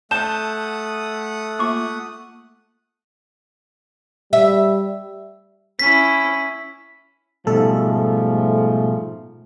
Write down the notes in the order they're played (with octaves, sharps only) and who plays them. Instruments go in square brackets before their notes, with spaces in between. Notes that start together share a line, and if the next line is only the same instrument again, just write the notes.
[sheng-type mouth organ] A3 F#5 D#6 [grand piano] A5 G6 [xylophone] E7
[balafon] A#3 F4 E5 [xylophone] C#6 D6
[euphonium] G3 [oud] E5
[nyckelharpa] C#4 E4 [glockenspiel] B6
[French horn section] G#2 F3 A3 [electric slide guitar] B2 G3 [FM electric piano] A4